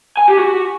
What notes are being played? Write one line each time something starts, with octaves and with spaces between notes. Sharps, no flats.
G#5
G4
F#4